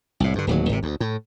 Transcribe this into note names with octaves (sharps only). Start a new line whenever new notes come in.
C2 A2
G2 D3
D1 D#2 F#3
G#1 C3
D2
A2